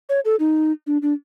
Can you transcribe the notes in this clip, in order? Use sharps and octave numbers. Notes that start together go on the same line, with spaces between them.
C#5
A4
D#4
D4
D4